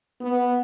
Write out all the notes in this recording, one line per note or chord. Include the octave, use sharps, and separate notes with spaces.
B3